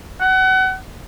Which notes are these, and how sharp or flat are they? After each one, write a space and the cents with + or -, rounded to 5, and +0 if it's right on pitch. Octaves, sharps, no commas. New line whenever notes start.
F#5 +30